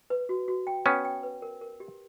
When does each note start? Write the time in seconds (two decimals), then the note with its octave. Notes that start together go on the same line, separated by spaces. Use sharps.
0.10 B4
0.29 F#4
0.48 F#4
0.67 G5
0.86 B3 C#4 G5
1.05 G5
1.23 B4
1.42 A#4
1.61 A#4
1.80 G4